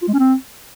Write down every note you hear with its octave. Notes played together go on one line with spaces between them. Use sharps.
F4
G#3
C#4
C4